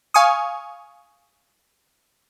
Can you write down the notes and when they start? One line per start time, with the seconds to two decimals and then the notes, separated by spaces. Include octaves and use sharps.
0.14 F5 G#5 C#6 D#6